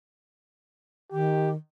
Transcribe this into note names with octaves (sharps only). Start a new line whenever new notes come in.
D#3 G4